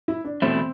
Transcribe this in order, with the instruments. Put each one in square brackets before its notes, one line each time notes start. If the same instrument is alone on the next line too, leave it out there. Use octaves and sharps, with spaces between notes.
[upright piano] E4
D4
[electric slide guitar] E2 B2 A3 E4 [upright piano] C4